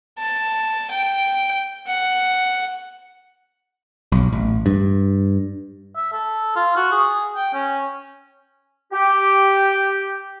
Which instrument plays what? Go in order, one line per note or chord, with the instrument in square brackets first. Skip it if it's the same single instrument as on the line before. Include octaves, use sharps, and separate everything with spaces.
[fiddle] A5
G5
F#5
[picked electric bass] B1
A1
G2
[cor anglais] E5
A4
F4
F#4
G#4
G5
C#4
[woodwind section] G4